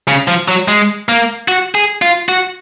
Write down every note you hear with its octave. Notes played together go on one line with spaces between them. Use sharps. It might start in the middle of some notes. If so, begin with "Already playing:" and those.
C#3
F3
F#3
G#3
A#3
F#4
G#4
F4
F#4